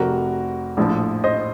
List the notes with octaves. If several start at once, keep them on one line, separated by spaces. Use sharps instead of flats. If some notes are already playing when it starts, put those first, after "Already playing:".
Already playing: F1 F2 C3 F#4 A#4
A#1 A2 F3
C5 D#5